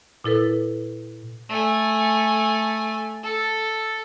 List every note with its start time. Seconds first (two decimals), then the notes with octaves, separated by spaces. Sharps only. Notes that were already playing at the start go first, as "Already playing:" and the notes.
0.24 A#2 E4 A4 B4
1.49 A3 G#5
3.24 A4